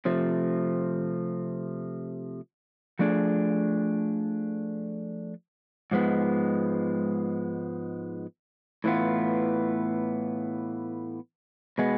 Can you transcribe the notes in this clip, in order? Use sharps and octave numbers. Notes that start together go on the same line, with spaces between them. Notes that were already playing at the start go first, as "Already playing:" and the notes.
C3 F3 A3
F3 A3 D4 G#4
G#2 F3 G#3 B3
A2 E3 B3 F4
B2 G#3 B3